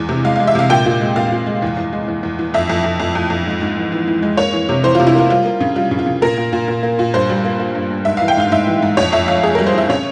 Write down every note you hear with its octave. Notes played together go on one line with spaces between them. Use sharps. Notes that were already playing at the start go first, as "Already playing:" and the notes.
Already playing: E2 G#3
C3
G#3 F5
G#3 F5
E5
C3 F5
A#2 G5
A#2
G#3
A#2 F5
A#2
G#3
E2
E2
G#3
E2
E2
E3
F2 E5
F2
F2
F2
F2
F2
G#2
G#2
E3
E3
E3
G#3
A#3 C#5
E3
C3
E3 C5
C3 F4
E4
A#3 F4
G3 F4
A#3
C#3
G3 F4
C#3
F4
C#3
A#2 A#4
A#2
A#2
A#2
A#3
A#2
G2 C5
G3
A#3
A#3
G2
G2
G#2 E5
E3 F5
G5
G#2 F5
G#2 E5
E3
G#2
F2 C#5
F2 E5
F2 F5
F2 G#4
G3 A#4
C5
E3 E5
C#3 C#5